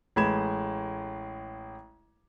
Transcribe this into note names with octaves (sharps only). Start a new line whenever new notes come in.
A1 G#3 B5 G#6 E7